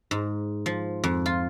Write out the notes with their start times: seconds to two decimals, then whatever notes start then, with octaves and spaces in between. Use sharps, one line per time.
0.11 G#2
0.66 F3
1.04 F2
1.26 F4